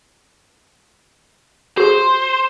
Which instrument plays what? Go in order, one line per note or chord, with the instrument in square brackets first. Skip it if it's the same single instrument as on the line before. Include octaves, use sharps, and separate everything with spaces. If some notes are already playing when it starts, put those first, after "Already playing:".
[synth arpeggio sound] F#4 G#4 [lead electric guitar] C5